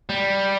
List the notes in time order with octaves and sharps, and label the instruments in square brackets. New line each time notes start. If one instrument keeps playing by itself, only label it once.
[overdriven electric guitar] G3